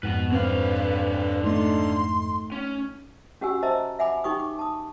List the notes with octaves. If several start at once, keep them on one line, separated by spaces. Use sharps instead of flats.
F2 G#2 B3 F#4 B4
D3 C4 B4 F5
A3 D#4 C6
C#4
C#4 F#4 G4 F#5 G#5 E6
C5 D#5 E5 A5 A#5 E6
E5 F#5 G#5 B5 D6
D#4 G4 G5 C#6 D#6
D6
A5 D#6